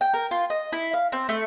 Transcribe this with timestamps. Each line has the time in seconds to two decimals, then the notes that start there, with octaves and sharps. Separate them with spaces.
0.01 G5
0.14 A#4
0.31 F4
0.50 D#5
0.72 E4
0.93 F5
1.12 C4
1.29 A3